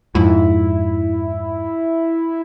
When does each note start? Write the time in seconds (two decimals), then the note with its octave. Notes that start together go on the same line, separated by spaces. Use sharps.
0.15 F2 G#2 E4